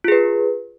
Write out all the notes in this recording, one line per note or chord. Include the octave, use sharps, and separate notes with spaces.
F4 G#4 B4